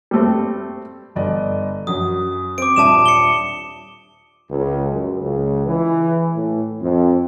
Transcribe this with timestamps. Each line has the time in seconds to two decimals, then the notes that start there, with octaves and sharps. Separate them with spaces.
0.11 G3 A3 C4
1.16 G1 D5 D#5
1.87 F#2 F#3 D#6
2.58 C4 D6 D7
2.76 D#1 D4 E5 A5 D6 E7
3.06 C#7 G7
4.50 C#2
4.92 F#2
5.21 C#2
5.67 E3
6.34 A2
6.81 F2